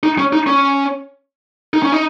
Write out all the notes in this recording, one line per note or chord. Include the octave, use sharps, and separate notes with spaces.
D#4
C#4
D#4
C#4
D#4
C#4
D#4